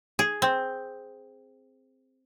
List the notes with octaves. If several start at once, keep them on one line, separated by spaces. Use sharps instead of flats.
G#4
C4